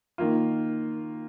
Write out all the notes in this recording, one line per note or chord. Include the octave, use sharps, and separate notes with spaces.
D#3 A#3 F4